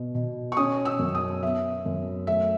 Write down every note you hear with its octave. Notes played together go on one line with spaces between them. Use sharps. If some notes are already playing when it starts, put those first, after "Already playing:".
Already playing: B2
B2
C#6
C#4 D#6
E6
F#2
D#6
B3 E5
F#2
A3 E5